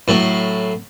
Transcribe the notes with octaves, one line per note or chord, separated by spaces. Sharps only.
A2 F#3